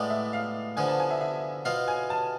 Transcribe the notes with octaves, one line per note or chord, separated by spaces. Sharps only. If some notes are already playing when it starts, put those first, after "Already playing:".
Already playing: A2 G#3 B3 D5
E5
F5
D3 F3 B3 G#5
A5
G#5
E5
E5
B2 B3 F4 F5
G#5
A5